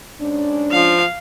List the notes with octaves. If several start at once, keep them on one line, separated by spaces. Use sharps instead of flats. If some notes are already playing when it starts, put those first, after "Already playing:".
G#2 C#4 D4
F3 F5